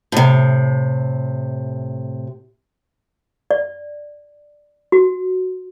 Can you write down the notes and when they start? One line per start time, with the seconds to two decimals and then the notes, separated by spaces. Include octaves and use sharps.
0.12 A2 C3
3.51 D5
4.92 F#4